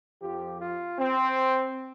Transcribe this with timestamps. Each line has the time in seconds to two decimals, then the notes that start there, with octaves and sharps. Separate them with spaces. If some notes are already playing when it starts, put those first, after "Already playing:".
0.21 F2 F3 G4
0.60 F4
0.98 C4